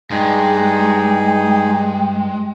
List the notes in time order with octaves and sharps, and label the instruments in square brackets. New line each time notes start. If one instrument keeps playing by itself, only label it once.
[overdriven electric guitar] G2 [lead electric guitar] G#3 [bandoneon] D#4 G#4 [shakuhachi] G5